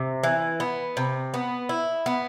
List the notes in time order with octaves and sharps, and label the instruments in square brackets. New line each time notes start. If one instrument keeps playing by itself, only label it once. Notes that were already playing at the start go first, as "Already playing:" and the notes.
Already playing: [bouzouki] C3
E3
B3
C3
B3
E4
B3